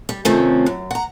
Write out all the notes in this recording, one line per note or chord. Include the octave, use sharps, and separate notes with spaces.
G3
C3 D#3 F3 A3 C4 C#4
F#2
F#5 A#5